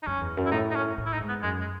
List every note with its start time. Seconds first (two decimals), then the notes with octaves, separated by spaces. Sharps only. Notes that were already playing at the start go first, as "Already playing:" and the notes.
0.03 D#4
0.07 F#2 C#4
0.21 E2
0.37 F#2
0.46 E4
0.51 A2 D#4
0.71 D#4
0.75 C#4
0.97 A2
1.06 E4
1.13 D#4
1.21 G#2
1.28 B3
1.42 F#2 G#3
1.60 G#3